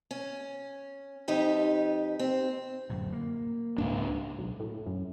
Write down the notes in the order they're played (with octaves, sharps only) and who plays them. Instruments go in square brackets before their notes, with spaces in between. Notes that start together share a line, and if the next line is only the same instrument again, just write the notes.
[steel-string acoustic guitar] C#4
F2 D#4 G4 B4
C4
[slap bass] D1 F#2 A2
A#3
[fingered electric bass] C#2 G#2 D4
[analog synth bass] B1
A2
F#2